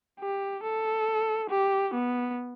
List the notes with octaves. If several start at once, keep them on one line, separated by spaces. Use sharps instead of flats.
G4
A4
G4
B3